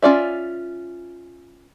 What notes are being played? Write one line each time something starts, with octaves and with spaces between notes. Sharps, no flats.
C#4 F4 D5 E5